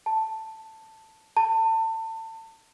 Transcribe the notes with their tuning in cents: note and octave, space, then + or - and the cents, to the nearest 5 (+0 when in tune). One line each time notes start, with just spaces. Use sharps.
A5 +5
A5 +30